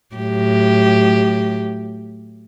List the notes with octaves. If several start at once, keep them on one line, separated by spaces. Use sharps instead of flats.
A2 F#3 G4